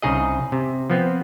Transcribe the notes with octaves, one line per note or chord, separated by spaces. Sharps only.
C2 C#3 D#4 G#4 D#5
C3
F3 B3 C4